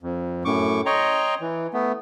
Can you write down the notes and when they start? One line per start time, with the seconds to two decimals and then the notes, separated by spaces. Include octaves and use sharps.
0.03 F2
0.45 F#2 A2 C#6 D6
0.86 C#5 D#5 G5 A#5 C6 C#6
1.41 E3
1.73 A3 B3